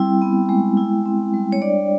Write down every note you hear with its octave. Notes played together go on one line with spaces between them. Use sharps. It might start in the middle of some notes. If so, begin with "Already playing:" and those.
Already playing: G3 C4 E4 G5
B3
G#3
E4
C4
G3
C#5
D4 D5